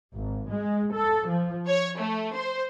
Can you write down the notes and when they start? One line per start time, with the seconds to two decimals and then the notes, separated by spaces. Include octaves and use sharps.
0.14 G#1
0.49 G#3
0.93 A4
1.28 F3
1.67 C#5
1.99 A3
2.35 C5